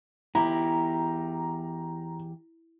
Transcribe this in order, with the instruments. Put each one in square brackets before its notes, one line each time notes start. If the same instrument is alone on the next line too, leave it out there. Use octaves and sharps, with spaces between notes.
[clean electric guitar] E2 G4 [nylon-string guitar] E4 [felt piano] A#5